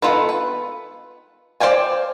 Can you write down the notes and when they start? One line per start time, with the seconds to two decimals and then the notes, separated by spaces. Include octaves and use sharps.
0.02 D#3 B3 F4 A4 B4
0.29 B4
1.60 C5 D5 F5 G5 G#5